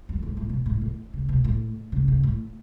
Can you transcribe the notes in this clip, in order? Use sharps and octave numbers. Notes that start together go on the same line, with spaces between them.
F#2
G#2
A2
B2
A2
A2
C#3
B2
A2
C#3
C#3
A2